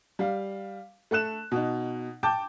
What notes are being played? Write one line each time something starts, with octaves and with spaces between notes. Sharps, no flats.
G3 F5
A3 A4 F#6 E7
B2 D#4
G5 A5 D6 G6